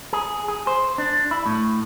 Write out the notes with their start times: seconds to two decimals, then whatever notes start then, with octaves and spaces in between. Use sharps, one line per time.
0.13 G#4
0.48 G#4
0.67 C5
0.98 D4
1.31 E4
1.46 A2